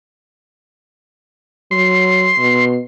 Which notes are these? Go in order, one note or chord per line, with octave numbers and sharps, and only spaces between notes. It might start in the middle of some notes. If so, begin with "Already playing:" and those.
F#3 C6
B2